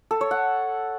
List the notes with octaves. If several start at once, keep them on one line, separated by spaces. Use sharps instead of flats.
A4
C#5
F#5